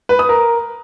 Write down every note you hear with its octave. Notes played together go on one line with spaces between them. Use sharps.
B4
D#6
A#4